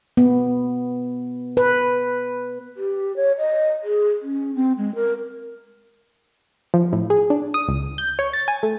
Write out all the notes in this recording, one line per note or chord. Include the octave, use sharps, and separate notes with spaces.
B3
B4
G4
C#5
D#5
G#4
C#4
C4
G#3
A#4
F3
A2
G#4
D4
D#6
C#2
G6
C#5
A6
G#5
A3